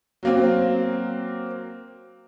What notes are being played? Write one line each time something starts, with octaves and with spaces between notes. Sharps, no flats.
F#3 A#3 C4